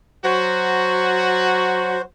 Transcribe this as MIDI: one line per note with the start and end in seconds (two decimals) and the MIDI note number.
0.25 2.00 54
0.25 2.00 66
0.25 2.02 72